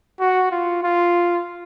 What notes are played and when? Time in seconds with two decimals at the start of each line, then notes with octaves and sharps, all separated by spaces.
0.20 F#4
0.52 F4
0.83 F4